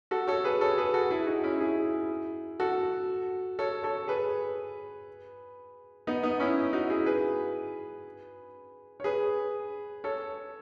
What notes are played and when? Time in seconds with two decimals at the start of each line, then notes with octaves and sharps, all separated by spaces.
0.11 F#4 A4
0.27 A4 C#5
0.44 G#4 B4
0.61 A4 C#5
0.78 G#4 B4
0.94 F#4 A4
1.11 E4 G#4
1.27 D#4 F#4
1.43 C#4 E4
1.60 E4 G#4
2.60 F#4 A4
3.59 A4 C#5
3.84 A4 C#5
4.08 G#4 B4
6.07 B3 D#4
6.23 B3 D#4
6.40 C#4 E4
6.73 D#4 F#4
6.90 E4 G#4
7.06 G#4 B4
9.00 C#5
9.04 G#4 B4
10.04 A4 C#5